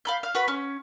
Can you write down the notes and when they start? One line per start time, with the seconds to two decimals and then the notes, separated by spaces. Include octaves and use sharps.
0.05 F5 B5 G6
0.23 F5
0.35 F#4 B4 B5
0.48 C#4